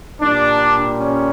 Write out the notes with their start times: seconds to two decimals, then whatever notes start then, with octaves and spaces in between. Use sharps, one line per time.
0.21 A#2 G3 D4
1.00 C#4